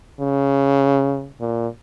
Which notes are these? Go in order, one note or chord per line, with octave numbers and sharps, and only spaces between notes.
C#3
A#2